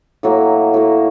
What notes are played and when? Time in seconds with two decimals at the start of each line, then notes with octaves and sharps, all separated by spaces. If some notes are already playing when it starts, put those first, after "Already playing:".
0.23 A2 F#3 A#3
0.74 A2 F#3 A#3